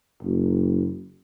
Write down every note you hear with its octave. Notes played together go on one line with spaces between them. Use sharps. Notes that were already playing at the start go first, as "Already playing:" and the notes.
F#1